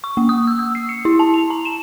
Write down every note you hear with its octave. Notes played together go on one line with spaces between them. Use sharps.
C#6
A#3
D#6
E6
E6
C7
C#7
E4
A5
F7
A#5
E7